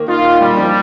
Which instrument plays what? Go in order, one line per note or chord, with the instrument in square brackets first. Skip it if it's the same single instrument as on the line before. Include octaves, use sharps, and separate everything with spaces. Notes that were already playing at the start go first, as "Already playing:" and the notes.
Already playing: [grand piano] D#3 A#3
[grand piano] D#4 [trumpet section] F4
[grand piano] G4
[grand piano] A#2 [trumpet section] G3
[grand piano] F3